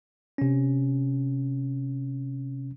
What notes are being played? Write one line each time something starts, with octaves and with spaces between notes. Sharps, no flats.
C3 C#4